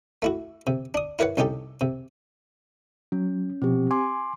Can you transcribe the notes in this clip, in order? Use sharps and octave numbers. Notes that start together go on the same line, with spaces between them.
A3 E4 F#4
C3
D4 D#6
E4 A#4 B4 C#5 F#5
C2 C#4 D#4 G4 A4
C3
F#3 C#4
B2 F3 C4 G4
G#5 C6 D6